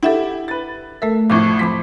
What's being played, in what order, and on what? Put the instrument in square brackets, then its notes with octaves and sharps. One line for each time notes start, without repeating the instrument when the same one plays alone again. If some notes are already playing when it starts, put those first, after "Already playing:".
[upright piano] E4 G4 [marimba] A4 E5 F#5
[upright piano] B4 A6
[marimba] A3 A4 A#4 [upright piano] E5
[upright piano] C2 F2 A2 [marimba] C#6 D6
[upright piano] F2 D6 B6 [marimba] B5 C6